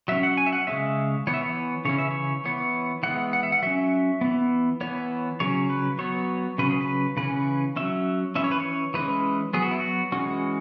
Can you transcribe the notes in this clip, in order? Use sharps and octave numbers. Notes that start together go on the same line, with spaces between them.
F#3 C#4 E5
F#5
G#5
E5
F#5
C#3 G#3 C#4 E5
E3 B3 C#5
E5
C#5
C#3 E3 C#4 C#5
E5
C#5
E3 B3 C#5
E3 G#3 B3 F#5
F#5
E5
F#5
F#3 C#4 E5
E3 B3
E3 B3 C#5
C#3 F#3 C#4 C#5
B4
F#3 B3 C#5
C#3 F#3 C#4 B4
G#4
B4
C#3 E3 C#4 B4
F#3 C#4 E5
E3 C#4 E5
C#5
B4
C#5
E3 G#3 C#4 B4
F#3 B3 G#4
F#4
E4
F#4
E3 G#3 C#4 F#4